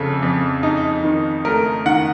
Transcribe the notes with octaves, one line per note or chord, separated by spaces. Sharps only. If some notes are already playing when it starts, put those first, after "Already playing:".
Already playing: F2 C#3 A4
F2
D#4
D#3
A3 A#4
D#3 F#5